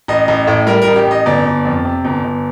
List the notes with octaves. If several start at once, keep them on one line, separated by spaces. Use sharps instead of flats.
A1 D#5
A1
A2
G3 A#4
A#4
A1
G4
A1 D#5
G1 D5
G1
F2
C3
G1
G1